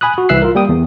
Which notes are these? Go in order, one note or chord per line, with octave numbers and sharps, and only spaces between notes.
G#5 B5 D#6 F#6
F#4
C2 E3 E5 E6 F#6 C7
F4 A#4
G3 A#3 G5 D#6
E2